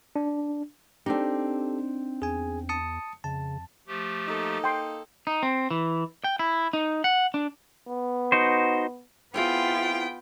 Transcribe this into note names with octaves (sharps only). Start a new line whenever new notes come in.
D4
C4 D4 D#4 G4 A4
E2 G#4 G#5
A5 D#6 C#7
F2 C#3 A5
F3 A3 G4
A#3 D#4 A4
G5 C6
D#4
C4
E3
G5
E4
D#4
F#5
D4
B3
D#4 F#4 C5
B3 C4 E4 F4 G#4 G5